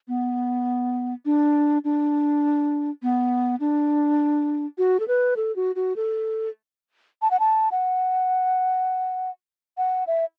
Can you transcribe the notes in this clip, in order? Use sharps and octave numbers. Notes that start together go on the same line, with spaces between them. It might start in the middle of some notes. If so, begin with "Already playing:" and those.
B3
D4
D4
B3
D4
F#4
A4
B4
A4
F#4
F#4
A4
A5
F#5
A5
F#5
F#5
E5